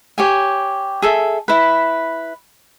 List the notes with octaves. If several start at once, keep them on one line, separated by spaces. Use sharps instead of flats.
G4 C#5 G#5
G#4 A4 E5
E4 B4